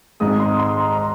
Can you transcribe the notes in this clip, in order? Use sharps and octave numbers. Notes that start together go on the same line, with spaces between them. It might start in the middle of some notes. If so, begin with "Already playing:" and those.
G#1 G#2 G#3 D#4 D#6
C6
D#6
C6
A#5
A#5